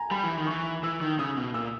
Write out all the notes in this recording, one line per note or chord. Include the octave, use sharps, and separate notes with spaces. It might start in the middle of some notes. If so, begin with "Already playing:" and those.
Already playing: G#5 A#5
G3 B5
E3
D#3
E3 C#6
E3 E6
D#3
C#3 D#6
B2
A#2 E6